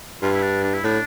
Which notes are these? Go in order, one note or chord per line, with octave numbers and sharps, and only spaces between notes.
G2 F4
E4
D4
D4
E4
A2 D4